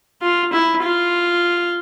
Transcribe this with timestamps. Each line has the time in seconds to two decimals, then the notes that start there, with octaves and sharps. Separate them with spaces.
0.22 F4
0.53 E4
0.84 F4